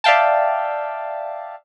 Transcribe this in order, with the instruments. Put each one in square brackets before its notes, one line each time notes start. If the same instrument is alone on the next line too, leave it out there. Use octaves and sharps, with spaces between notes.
[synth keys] D5 E5 F5 G5 A5